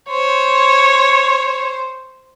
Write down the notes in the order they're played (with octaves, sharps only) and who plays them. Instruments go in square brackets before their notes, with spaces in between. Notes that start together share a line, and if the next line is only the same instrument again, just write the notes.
[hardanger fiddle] C5 [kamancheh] C#5